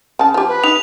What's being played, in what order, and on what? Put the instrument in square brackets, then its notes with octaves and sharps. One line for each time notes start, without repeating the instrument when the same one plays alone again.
[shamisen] C#3 A5
F3 G4
[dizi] B4
[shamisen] D#4 [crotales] F7